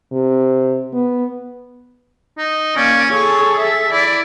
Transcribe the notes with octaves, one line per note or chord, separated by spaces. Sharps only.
C3
B3
D#4
A#3 C#4 D5
G#4 A4 C#5
E5
E4 D5